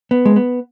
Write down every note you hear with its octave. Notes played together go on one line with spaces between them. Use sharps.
B3
G#3
B3